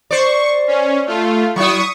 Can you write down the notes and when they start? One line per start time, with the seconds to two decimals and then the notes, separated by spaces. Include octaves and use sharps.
0.11 C5 D5 C#6
0.68 C#4
1.06 A3 F4
1.56 F#3 E4 C#6 D#6